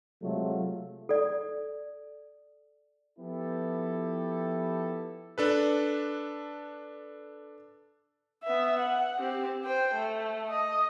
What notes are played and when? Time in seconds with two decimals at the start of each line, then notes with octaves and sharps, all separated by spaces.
0.23 C3 F#3 G#3 A3 F4 A4
1.09 A4 D5
3.19 F3 B3 E4 G4 A4
5.38 D4 A4 B4
8.44 B3 E5
8.79 F#5
9.18 C4 G4
9.65 C5 G5
9.94 A3
10.49 D#5